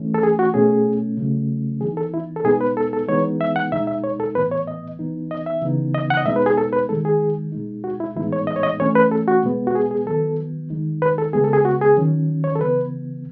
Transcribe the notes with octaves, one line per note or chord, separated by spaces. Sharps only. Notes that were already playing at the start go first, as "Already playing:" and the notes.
Already playing: E3 A3 C#4
A4
G#4
F#4
B2 A3 C#4 G#4
C#3 F#3 A3 C#4
E3 B3 D#4 G#4
A4
E4
A4
B2 G#3 B3 D#4 G#4
B4
A4
A4
E3 G#3 B3 D#4 C#5
E5
F#5
B2 G#3 D#4 E5
E5
C#5
A4
A2 E3 B3 B4
C#5
D#5
E3 B3 D#4
D#5
E5
C#3 E3 B3 D#4
D#5
F#5
D#5
B2 G#3 B3 D#4 E5
B4
G#4
A4
B4
D#3 G#3 D#4 A4
G#4
B2 G#3 D#4
F#4
E4
A2 E3 G#3 B3 D#4 E4
C#5
D#5
C#5
D#5
E3 A3 C#4 C#5
B4
A4
F#4
B2 G#3 B3
F#4
G#4
G#4
D#3 F#3 B3 A4
D#3 G#3 D#4
B4
A4
C#3 G#3 B3 G#4
A4
G#4
F#4
G#4
D#3 F#3 C#4
C#5
A4
C#3 E3 B3 B4